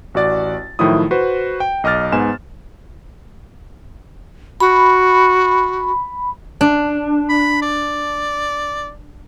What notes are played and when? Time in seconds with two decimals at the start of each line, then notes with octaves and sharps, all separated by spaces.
0.14 A1 F#4 D5 A6
0.79 A2 D#3 F3 F#3 E4 D#6
1.11 F#4 B4 C5
1.60 G5
1.84 B1 D#5 D6 F6 A6
2.12 G#2 B3 G#5 E7
4.60 F#4 B5
6.61 D4
7.29 B5
7.62 D5